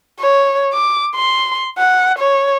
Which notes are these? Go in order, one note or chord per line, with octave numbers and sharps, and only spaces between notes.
C#5
D6
C6
F#5
C#5